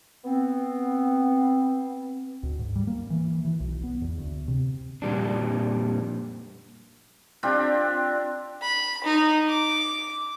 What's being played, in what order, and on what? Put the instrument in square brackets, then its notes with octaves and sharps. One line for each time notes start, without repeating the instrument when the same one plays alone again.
[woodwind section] B3 C4
[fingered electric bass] D2
G#2
G3
A#3
E3
E3
B1
B3
E2
D2
C3
[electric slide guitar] F2 A#2 G3 D4
[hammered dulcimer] C4 D4 F4 G4
[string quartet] B5
D#4
D6